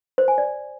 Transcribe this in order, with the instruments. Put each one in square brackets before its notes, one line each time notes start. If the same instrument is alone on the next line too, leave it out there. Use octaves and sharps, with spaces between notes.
[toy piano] C5
G#5
D5